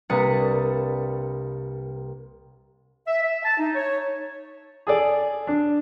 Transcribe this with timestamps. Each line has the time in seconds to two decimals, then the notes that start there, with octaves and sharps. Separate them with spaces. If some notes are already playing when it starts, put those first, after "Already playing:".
0.10 C2 A#3 D4 B4 D#6 C#7
3.07 E5
3.22 E5
3.45 A5
3.59 D#4
3.75 C#5
4.87 G#4 A4 D5
5.47 D4